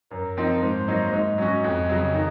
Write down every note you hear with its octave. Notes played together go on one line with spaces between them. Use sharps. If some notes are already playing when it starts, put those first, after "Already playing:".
F#2 A#4
F3 C4 D#4
G#2 C5
F#3 A#3 D#4
G#2 D#5
F#3 C#4 F#4
F2
C#3 F#3
D#3